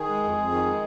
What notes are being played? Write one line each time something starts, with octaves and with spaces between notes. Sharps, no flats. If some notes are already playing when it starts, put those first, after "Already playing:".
Already playing: D#3 G#4
G#3
F2
F2
D#3
G#3